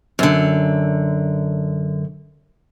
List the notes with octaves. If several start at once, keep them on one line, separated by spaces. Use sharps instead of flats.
F#2 D3